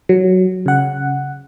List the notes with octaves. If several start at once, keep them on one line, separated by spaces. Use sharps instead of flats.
F#3
C#3 F#5